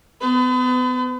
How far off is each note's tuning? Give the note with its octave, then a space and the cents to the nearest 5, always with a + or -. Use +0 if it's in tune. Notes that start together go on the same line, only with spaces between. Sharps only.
B3 +30 B4 +40